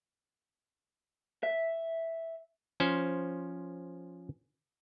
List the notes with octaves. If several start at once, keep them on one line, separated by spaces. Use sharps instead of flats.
E5
F3 C#4 C5